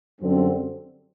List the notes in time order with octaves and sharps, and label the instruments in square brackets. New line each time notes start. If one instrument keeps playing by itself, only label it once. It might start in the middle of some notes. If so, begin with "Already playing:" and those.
[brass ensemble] F#2 D3 G3 C4